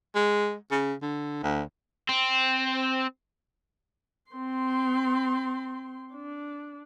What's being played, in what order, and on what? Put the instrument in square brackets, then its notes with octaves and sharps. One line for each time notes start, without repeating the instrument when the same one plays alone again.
[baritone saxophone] G#3
C#3
D3
D2
[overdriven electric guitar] C4
[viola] C4 C6
D4